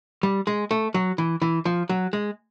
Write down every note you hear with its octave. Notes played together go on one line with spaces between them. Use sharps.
G3
G#3
A3
F#3
E3
E3
F3
F#3
G#3